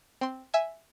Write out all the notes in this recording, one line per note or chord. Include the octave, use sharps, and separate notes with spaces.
C4 C6
E5 G#5